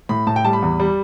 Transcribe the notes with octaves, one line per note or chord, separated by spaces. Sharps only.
A2 B5
A2 A5
G5
G3 A5
B5
E2
G3